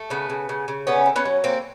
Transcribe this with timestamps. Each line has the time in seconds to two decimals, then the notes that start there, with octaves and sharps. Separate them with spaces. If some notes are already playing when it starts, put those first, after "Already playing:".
Already playing: A3
0.10 C#3 B3
0.30 C#3
0.49 C#3
0.68 C#3
0.87 D3 B3 C#4
1.06 D3
1.16 B3 C#4
1.25 F#3
1.44 D3 A#3 C4